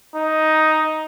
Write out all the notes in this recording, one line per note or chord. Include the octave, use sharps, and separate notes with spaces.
D#4